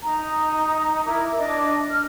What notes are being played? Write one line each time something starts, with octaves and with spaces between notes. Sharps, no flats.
D#4 A#5
E4 A#4 D6
D4 D#5 D6
F6